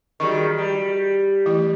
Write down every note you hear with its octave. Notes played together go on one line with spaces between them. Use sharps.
D#3 G3 F#4 G#4 C#6
G3
E3 A3 E4